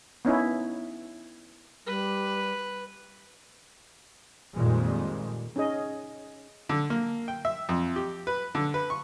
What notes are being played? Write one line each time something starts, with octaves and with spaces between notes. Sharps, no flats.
B3 C#4 D#4 E4
G3 B4
F2 A#2 D#3 G3 G#3
C#4 D#4 G#4 D#5
D3
A#3
G5
E5
F2
G4
B4
D3
B4
C#6